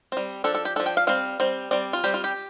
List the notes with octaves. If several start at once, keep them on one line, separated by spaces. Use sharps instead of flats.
G3 C4
F3 D4 A4
A4
G4
F3 D4 A4
G5
F5
G3 C4 F5
G3 C4
G3 C4 D5
F4
G3 C4 G4
F4
G4